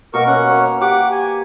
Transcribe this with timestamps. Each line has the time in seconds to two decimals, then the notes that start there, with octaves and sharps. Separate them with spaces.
0.14 B2 A#3 F#4 A#4 C#6
0.27 C#4 F#5
0.49 A#3 C#5
0.81 G4 F#5 C#6 D6
1.11 G#5